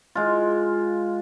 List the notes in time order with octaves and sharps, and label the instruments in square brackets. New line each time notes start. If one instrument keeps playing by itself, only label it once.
[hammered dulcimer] G#3 F4